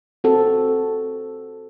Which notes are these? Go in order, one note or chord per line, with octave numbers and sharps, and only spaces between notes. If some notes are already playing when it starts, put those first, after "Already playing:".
C4 F#4 A4